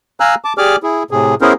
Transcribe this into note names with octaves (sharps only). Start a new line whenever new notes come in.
F5 G#5 A#5 E6 F#6
A5 D6
G4 G#4 D5 G#5 D6 F6
E4 G#4
A2 C3 G#4
B3 C#4 E4 G#4 A#4 C5